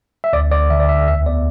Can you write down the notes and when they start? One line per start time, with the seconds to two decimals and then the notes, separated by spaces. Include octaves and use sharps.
0.24 E5
0.33 D2 D5
0.51 D2 D5
0.70 D3 E5
0.80 D5
0.89 D2 E5
1.07 E2 E5
1.26 B3 D5